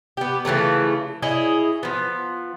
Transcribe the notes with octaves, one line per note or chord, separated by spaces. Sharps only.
B3 G4
C#3 E3 F3 A3
E4 G#4 C#5 D#5
F3 B3